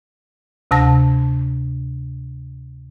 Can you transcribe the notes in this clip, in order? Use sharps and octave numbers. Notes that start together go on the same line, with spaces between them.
D2 C3 A5 A#6